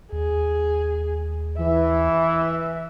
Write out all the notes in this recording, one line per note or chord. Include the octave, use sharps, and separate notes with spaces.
D#2 G#4
E3 E5